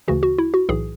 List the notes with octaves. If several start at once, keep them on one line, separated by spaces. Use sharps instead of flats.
D2 C#3 E3 F#4
F#4
E4
F#4
B1 A2 E3 G#4